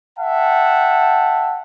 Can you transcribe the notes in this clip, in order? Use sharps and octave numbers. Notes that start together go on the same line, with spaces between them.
E5 F#5 G5 A5